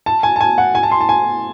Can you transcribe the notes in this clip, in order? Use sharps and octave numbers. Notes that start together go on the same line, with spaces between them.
A5
G#5
A5
G#5
F#5
G#5
A5
C6
A5
G#5